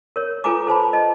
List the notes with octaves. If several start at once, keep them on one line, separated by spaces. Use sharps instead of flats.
A#4 C#5
F4 A4 B4 G#5 A#5 D6
A4 C5 A5 B5
D#5 A5